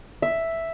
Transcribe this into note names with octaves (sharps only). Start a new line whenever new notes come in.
E5